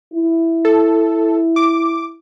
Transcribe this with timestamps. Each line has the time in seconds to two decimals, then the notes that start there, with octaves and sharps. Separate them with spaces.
0.14 E4
0.65 A4
1.56 D6